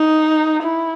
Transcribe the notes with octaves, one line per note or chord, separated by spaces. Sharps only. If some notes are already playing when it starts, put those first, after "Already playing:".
Already playing: D#4
E4